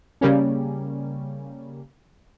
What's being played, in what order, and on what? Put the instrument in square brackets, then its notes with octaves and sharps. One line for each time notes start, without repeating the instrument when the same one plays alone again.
[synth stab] C#3 G3 A#3 C#4